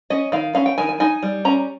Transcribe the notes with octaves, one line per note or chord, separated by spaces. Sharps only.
C#4 D#5
D#3 F5
C#4 F5
G5
D#3 G#5
G#5
D#4 G#5
G3
C#4 A#5